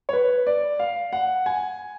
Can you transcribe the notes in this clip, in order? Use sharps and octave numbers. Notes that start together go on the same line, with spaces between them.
C#5
B4
D5
F5
F#5
G#5